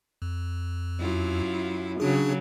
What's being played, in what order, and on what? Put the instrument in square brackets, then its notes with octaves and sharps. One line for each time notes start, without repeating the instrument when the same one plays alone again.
[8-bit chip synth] F2
[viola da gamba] F#2 E4 F4
[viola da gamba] C#3 F#3 [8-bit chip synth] D4 G#4